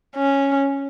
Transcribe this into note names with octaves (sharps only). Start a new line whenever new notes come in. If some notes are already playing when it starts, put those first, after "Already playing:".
C#4